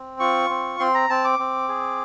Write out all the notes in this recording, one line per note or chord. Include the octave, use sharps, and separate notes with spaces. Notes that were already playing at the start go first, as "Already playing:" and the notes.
Already playing: C4
F4 C#6
C4
C4 C6
A#5
C4 A5
D6
C4
G#4